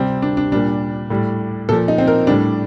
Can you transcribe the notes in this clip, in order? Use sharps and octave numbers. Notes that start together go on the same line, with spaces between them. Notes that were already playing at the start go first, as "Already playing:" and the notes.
Already playing: C3 G3 C4
D4
D4
A#2 G3 D4
A2 G3
A#2 F3 A4
D#4
C4
A#4
A2 G3 D4